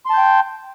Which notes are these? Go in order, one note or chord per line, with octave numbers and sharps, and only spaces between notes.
G5 A5 C6 G6